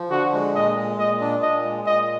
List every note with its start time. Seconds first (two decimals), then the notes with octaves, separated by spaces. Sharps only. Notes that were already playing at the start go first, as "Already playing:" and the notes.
Already playing: F3
0.10 D3 F#4
0.33 G#3
0.55 A#2 D#5
0.77 G#3
0.99 A#2 D#5
1.21 D4
1.42 A#2 D#5
1.65 G#3
1.86 A#2 D#5